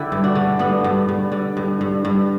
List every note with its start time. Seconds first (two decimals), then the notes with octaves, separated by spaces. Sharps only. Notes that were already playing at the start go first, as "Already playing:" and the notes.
Already playing: D3 E4 G4
0.12 G2
0.24 D4 F#4
0.35 D3
0.59 G2 B3 D4
0.84 G2
1.09 G2
1.32 D3
1.57 G2
1.81 G2
2.05 G2